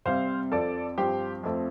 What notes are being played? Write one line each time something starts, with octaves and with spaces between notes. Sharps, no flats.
C3 G3 C4 C5 F5
F2 F3 C4 A4 D5
G2 F3 C4 G4 C5
F2 F3 A3 C4